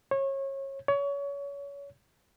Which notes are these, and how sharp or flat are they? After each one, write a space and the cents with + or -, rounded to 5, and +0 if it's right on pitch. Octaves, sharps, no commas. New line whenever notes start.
C#5 -25
C#5 +30